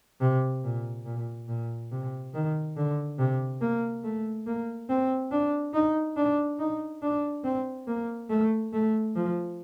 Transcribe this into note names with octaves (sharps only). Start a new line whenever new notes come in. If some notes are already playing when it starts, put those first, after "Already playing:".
C3
A#2
A#2
A#2
C3
D#3
D3
C3
A#3
A3
A#3
C4
D4
D#4
D4
D#4
D4
C4
A#3
A3
A3
F3